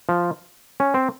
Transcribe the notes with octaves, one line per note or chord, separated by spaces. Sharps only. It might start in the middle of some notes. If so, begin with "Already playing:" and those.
F3
C#4
C4